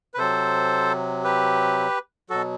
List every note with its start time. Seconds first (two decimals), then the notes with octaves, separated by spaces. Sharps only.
0.14 B4
0.17 C3 F#3 A4 C5
1.24 G4 B4
2.30 B2 F#3 F#4 A4